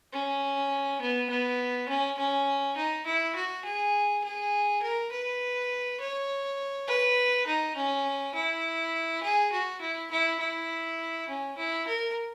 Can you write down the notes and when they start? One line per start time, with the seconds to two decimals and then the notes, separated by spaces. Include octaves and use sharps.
0.13 C#4
1.01 B3
1.30 B3
1.89 C#4
2.18 C#4
2.77 D#4
3.06 E4
3.35 F#4
3.65 G#4
4.24 G#4
4.82 A#4
5.11 B4
6.00 C#5
6.88 B4
7.46 D#4
7.76 C#4
8.35 E4
9.23 G#4
9.52 F#4
9.81 E4
10.11 E4
10.40 E4
11.28 C#4
11.58 E4
11.87 A#4